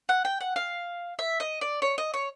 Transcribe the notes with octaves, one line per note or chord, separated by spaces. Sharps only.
F#5
G5
F#5
F5
E5
D#5
D5
C#5
D#5
C#5